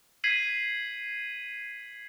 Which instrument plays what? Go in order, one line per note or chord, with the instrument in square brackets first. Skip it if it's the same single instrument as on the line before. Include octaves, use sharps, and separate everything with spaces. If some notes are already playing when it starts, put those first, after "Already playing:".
[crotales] G#6 B6 C7 D#7 F#7